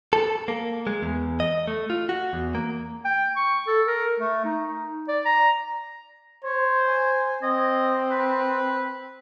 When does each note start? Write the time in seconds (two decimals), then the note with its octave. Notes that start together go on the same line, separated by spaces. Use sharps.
0.13 A4
0.48 A#3
0.87 G#3
1.03 E2
1.40 D#5
1.67 A3
1.90 F4
2.09 F#4
2.33 E2
2.55 A#3
3.05 G5
3.36 C#6
3.67 A4
3.87 A#4
4.20 A3
4.45 D#4
5.08 D5
5.25 A#5
6.45 C5 C#5
6.87 G#5
7.43 C4 D#5
8.11 B4